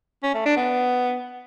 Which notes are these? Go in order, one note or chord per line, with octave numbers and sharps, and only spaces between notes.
C#4
A3
D4
B3